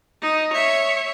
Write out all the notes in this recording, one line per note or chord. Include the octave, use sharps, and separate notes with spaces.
D#4
C#5 E5